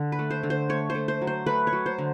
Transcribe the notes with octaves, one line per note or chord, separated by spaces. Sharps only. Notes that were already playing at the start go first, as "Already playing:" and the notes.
Already playing: D3
B4
A3
C5
D3
C5
A3 C#5
C5
A3
C5
F#3
C5
A3 B4
C#5
F#3
C5
D3